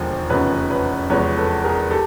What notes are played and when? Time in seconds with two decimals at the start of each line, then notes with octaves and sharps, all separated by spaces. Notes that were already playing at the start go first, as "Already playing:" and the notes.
Already playing: E1 D#2 D3 F3 G#3 A#4 C5
0.29 F1 E2 C#3 F3 B4 C#5
0.70 B4 C#5
1.10 E2 C3 F3 G#3 B4 C#5
1.37 A4 B4
1.64 G#4 A#4
1.91 G4 A4